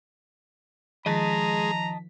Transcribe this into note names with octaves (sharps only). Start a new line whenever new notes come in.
D#3 F3 G#3 D#5 A5 A#5 B6